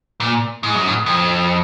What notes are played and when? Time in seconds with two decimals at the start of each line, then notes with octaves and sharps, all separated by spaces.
0.20 A#2
0.63 G#2
0.75 F#2
0.87 G#2
1.06 F2